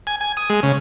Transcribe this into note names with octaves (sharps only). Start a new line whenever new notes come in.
G#5
G#5
D#6
G#3
C#3